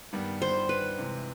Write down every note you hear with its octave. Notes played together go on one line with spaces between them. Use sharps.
G2 D#3 G3 B3
C5
B4
C3 E3 G#3